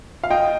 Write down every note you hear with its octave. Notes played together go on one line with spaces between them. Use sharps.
F5
D#5 G5